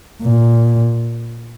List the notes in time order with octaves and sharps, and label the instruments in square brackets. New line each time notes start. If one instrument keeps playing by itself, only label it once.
[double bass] A#2